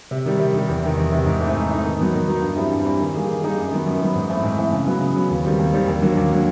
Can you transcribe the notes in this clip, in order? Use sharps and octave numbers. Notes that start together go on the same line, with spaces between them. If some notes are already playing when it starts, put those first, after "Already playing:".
C3
D#3 G3
C3
D#3 G3
E2
C3 D#3
E2
C3 D#3
G#2
E3 A3 C4 D#4
G#2
E3 A3 C4 D#4
D#3
F#3 B3 D#4
D#3
F#3 B3 D#4
G2
E3 G3 C4 E4
G2
E3 G3 C4 E4
D#3
G3 A#3 D#4 G#4
D#3
G3 A#3 D#4 G#4
F#2
D#3 F#3 B3
F#2
D#3 F#3 B3
G#2
E3 A3 C4 E4
G#2
E3 A3 C4 E4
C#3
F#3 B3
C#3
F#3 B3
D#2
D#3 G3 C4
D#2
D#3 G3 C4
D#2
D3 F#3 A#3
D#2
D3 F#3 A#3